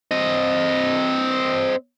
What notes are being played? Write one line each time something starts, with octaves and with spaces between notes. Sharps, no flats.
C4 D#5